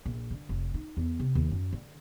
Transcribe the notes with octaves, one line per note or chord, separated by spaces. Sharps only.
A#1
D3
F1
D#4
E2
C3
D#2
F#2
D3